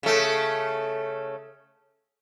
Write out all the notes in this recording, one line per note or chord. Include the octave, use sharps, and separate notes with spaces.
C#3 A3